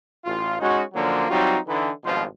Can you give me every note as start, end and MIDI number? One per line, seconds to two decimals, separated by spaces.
0.25 0.56 33
0.25 0.56 65
0.60 0.82 56
0.60 0.82 61
0.60 0.82 63
0.60 0.82 66
0.94 1.25 50
0.94 1.25 53
0.94 1.25 54
0.94 1.25 58
0.94 1.25 61
0.94 1.25 62
1.29 1.57 54
1.29 1.57 55
1.29 1.57 60
1.29 1.57 63
1.29 1.57 65
1.29 1.57 66
1.66 1.90 50
1.66 1.90 52
1.66 1.90 63
2.04 2.24 32
2.04 2.24 43
2.04 2.24 47
2.04 2.24 53
2.04 2.24 65
2.04 2.24 72